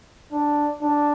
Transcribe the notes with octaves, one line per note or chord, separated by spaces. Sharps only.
D4
D4